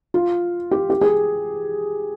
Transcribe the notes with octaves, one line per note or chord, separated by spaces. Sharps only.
F4
G4
G4
G#4